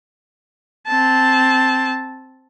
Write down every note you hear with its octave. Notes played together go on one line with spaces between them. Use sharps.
C4 A5